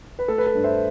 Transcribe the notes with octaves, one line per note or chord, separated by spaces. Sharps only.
B4
A3 A4
B4
A4
G2
C5 E5